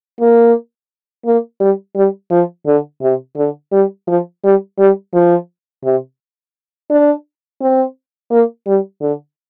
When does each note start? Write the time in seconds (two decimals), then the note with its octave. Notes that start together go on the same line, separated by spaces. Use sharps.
0.20 A#3
1.26 A#3
1.60 G3
1.96 G3
2.31 F3
2.66 D3
3.02 C3
3.37 D3
3.72 G3
4.07 F3
4.44 G3
4.79 G3
5.14 F3
5.85 C3
6.90 D4
7.61 C4
8.31 A#3
8.67 G3
9.01 D3